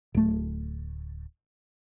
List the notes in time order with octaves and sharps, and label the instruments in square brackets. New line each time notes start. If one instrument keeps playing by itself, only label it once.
[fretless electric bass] D1 A3